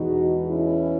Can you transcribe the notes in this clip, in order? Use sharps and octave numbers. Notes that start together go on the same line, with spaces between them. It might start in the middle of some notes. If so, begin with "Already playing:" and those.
Already playing: E2 B2 G#3 B3 D#4 F#4
C#4 E4